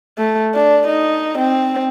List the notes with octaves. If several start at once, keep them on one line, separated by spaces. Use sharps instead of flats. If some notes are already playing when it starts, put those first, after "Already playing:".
A3
D4
D#4
C4